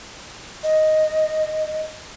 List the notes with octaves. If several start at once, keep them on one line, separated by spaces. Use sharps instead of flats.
D#5